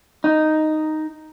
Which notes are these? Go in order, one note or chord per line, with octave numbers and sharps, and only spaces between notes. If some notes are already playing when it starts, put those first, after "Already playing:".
D#4